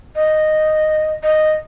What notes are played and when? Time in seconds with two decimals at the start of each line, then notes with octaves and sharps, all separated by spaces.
0.15 D#5
1.23 D#5